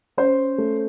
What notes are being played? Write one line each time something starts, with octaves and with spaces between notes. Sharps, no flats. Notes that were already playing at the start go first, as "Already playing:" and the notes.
C#4 C5
A3